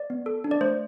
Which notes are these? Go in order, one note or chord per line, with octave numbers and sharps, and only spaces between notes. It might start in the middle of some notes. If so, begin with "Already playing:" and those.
Already playing: D5
B3
A4
D4
D5
A3 C5